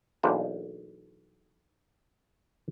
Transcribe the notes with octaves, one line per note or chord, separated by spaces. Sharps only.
B1 E2 A#3 D4 C5